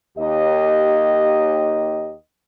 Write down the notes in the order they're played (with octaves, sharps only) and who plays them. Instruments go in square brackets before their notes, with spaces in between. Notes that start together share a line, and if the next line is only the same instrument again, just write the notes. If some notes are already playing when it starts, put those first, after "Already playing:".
[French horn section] D#2 G4 D#5